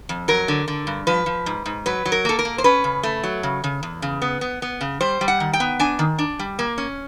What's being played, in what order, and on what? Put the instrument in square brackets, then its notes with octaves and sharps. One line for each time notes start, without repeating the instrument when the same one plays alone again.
[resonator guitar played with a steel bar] F2
F#3 A#4
D3
D3
G2
F3 B4
F3
G#2
G#2
F#3 B4
F#3
A#4
A#3 A4
A#4
A#3
C5
C#4 B4
C#3
A3
F#3
C#3
C#3
E2
C#3
B3
B3
B3
C#3
G3 C5
G3
F#5
D#3
G5
B3
D4 G#5
D#3
D4
G3
A#3
C#4